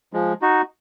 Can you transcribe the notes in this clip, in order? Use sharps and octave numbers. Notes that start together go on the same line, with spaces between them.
F3 G#3
D#4 F#4